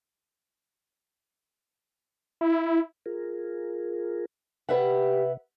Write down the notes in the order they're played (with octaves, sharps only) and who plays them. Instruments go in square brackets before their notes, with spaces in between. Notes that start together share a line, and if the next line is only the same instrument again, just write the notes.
[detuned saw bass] E4
[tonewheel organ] F4 G#4 A#4
[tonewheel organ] C3 [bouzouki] G3 G4 [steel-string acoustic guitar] B4 E5 F#5